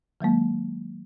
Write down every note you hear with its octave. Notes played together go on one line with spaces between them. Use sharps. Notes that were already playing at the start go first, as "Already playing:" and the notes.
D#3 F#3 G#3 A#3